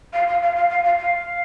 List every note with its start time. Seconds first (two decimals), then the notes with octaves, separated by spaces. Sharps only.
0.13 F5
0.28 F5
0.42 F5
0.56 F5
0.70 F5
0.84 F5
0.98 F5